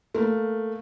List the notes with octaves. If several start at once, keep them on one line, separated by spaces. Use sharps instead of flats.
A3 A#3